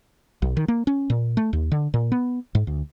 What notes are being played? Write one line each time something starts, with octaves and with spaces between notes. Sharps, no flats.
B1
D#3
A#3
C#4
A#2
A3
D#2
D3
A#2
B3
G#2
D2